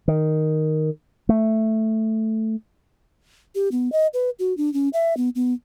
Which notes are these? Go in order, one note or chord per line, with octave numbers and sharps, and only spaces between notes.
D#3
A3
G4
B3
D#5
B4
F#4
D4
C#4
E5
B3
B3